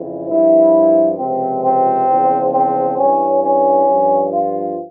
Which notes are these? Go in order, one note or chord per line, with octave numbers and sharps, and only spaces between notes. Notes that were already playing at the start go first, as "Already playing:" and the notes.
Already playing: F2 C#3 E3
G2 F3 E4
C#2 C3 F3 C4
C4
E2 C#3 F3
C4
G2 E3 C#4
C#4
G2 F3
F4